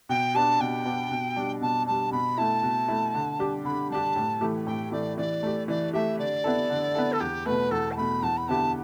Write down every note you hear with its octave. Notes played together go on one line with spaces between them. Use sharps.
B2 G5
B3 D4 G4 A5
B2 G5
B3 D4 G4
B2
G3 D4
B2 A5
G3 D4 A5
B2 B5
A3 E4 A5
B2
A3 E4
D3
G3 D4 G4
D3 B5
G3 D4 G4 A5
A2
E3 A3 G4
A2 G5
E3 A3 G4 D5
E3 D5
A3 G4
E3 D5
A3 G4 E5
D3 D5
B3 E4 A4
D3
B3 E4 A4
A4
E2 G4
B2 A3 B4
E2 A4
A5
B2 A3 B5
E2 A5
B5
D3 B3 E4 G4 A5